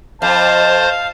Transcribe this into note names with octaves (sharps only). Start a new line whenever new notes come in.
F2 C5 F5 A5